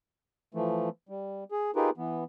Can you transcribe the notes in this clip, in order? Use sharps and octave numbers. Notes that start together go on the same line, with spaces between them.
E3 F3 A3
G3
G#4
D#4 F4 G4 G#4 A#4 B4
E3 B3